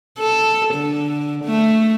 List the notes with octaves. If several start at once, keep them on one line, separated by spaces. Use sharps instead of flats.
A4
D3
A3